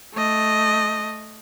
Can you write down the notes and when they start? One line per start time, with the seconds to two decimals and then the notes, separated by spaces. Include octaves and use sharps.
0.14 A3 D#5